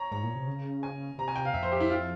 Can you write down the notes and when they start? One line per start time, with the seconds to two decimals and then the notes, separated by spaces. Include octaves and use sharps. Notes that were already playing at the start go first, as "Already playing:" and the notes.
Already playing: C#5 A#5
0.11 G#2 A#5
0.23 A#2
0.35 C3
0.47 C#3
0.83 G#5
1.18 C3 A#5
1.28 G#5
1.36 G5
1.45 F5
1.54 F2 E5
1.63 C5
1.72 G4
1.80 E4
1.90 F4